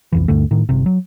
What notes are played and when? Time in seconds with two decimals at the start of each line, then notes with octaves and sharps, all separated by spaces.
0.12 B1 F2 E3
0.28 D2 G2 D3 A3
0.51 A2 D#3
0.69 G1 C3
0.86 F#3